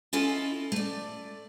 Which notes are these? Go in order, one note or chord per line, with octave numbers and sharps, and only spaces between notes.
C#4 E4 F4 A4 D#5
A3 D5